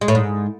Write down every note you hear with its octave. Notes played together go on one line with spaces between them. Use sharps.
G#3
A2
G#2